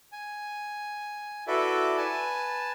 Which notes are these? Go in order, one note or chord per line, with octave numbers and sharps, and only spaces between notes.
G#5
E4 F#4 A4 B4 D5 E5
B4 G#5 A5